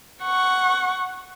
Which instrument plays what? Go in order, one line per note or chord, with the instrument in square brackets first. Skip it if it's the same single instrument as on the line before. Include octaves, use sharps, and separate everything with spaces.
[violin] F#5 C#6